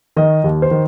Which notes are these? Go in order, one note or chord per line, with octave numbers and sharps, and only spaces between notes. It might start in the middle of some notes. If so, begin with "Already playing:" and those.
D#3 D#5
D#2
C5
D#3